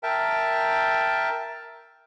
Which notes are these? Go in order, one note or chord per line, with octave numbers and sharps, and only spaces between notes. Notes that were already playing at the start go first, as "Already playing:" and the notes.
A#4 E5 G5 A5